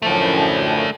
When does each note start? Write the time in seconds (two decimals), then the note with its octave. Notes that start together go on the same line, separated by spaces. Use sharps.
0.02 F#2 A2 F3 A3 D4